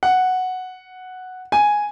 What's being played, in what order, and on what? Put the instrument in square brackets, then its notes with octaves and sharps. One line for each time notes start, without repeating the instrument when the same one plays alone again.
[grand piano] F#5
G#5